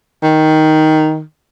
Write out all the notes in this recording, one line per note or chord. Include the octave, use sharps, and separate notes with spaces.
D#3